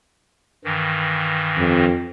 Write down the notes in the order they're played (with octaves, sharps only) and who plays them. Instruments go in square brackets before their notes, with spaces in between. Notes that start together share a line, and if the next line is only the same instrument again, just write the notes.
[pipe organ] G2 D#3 E3
[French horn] F2